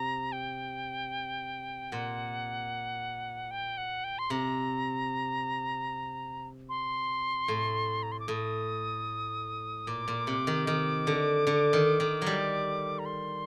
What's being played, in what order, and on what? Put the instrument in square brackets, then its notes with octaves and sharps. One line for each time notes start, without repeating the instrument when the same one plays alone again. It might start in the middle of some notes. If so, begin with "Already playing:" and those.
Already playing: [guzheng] C3 [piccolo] A#5
[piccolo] G5
[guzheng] A#2 [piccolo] F#5
[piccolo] G5
F#5
G5
C6
[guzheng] C3 [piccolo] A#5
[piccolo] C6
[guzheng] A2
[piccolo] A#5
C6
D6
[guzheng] A2 [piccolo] D#6
[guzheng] A#2 [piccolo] D6
[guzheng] A#2
C3
D#3
D#3
D3
D3
D#3
D#3
F#3 G3
[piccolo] A#5
C6